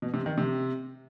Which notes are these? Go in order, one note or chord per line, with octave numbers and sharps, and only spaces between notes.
B2
C3
D#3
C3